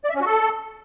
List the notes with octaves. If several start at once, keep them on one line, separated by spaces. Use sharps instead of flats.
D5
E5
C#4
F#4
A4